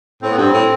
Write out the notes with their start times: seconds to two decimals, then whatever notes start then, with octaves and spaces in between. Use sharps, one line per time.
0.22 A2 C4
0.31 B3
0.38 G2 C4
0.53 A2